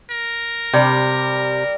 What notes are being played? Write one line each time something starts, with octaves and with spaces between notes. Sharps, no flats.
A#4
C3 G3